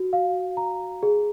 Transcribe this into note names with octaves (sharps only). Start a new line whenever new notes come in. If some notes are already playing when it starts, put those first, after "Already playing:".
Already playing: F#4
F5
A#5
G#4